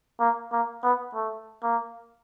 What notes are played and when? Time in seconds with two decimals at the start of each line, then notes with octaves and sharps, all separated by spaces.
0.20 A#3
0.52 A#3
0.83 B3
1.15 A3
1.63 A#3